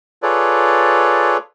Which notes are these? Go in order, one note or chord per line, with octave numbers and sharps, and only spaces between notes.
F4 G#4 A4 B4 C#5 D5